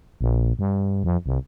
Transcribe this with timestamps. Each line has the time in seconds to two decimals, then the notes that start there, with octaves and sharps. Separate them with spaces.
0.21 A#1
0.59 G2
1.04 F2
1.26 C2